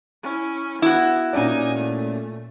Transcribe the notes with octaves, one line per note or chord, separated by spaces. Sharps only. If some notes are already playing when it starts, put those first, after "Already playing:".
C#4 E4
B3 E4 F#4
A#2 C#4 D#4 D5 G#5
A3